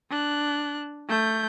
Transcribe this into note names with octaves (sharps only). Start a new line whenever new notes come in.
D4 F#6
A3 G6